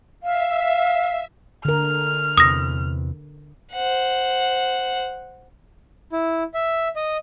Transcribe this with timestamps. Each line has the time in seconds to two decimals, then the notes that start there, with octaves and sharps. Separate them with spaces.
0.23 E5 F5
1.65 D3 A#4 F6
2.37 E2 C3 D#6 A#6
3.73 C5 F#5
6.12 E4
6.54 E5
6.96 D#5